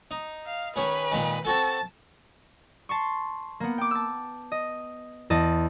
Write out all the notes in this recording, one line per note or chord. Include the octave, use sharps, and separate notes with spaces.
D#4
F5
D#3 C#4 G#4 B4
A#2 D#3 G#3
C4 F#4 A4 A5
A5 C6 C#6
A#3 B3
G5 D6
A5 E6
D#5
E2 D#5 A5